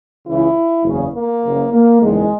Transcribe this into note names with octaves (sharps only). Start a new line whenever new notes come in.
C#2 C#3 E3 E4
F#1 E2 C#3
A#3
F#1 F#2 C#3 F#3
A#3
F#1 E2 D#3 F#3 G#3